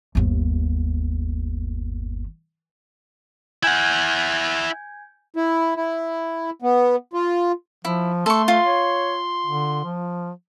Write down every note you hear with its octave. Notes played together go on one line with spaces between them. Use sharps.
G1 D#2
E4 F#5 G#5 G6 G#6
E4
E4
B3
F4
F3 E4
A3 A4 C6 C#6
F4
C#5
D3
F3